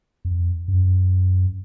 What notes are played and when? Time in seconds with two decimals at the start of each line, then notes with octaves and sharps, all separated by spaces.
0.25 F2
0.68 F#2